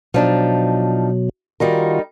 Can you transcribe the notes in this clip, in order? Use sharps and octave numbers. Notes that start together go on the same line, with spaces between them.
B2 F3 F#3 D4 D#4
D#3 G3 D#4 F4 F#4 A#4